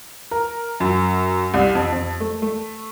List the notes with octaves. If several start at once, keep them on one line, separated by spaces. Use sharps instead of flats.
A#4
F#2
C2
F2
F2
A3
A3